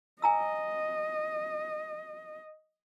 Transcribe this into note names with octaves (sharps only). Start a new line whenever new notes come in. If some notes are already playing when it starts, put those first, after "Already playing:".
D#5 G#5 A#5 E6